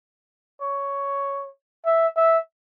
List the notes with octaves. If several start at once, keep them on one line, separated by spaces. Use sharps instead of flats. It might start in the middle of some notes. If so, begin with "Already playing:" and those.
C#5
E5
E5